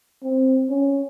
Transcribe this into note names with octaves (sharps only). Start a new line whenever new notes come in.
C4
C#4